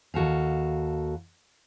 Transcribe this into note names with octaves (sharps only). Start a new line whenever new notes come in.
D#2 F#4 A4 F5